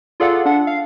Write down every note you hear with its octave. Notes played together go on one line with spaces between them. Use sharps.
F4 G#4 A4 D5 F5 F#5
D4 F#5
F5